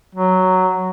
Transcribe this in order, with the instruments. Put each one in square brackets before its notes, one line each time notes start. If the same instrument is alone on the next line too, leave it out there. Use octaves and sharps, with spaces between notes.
[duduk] F#3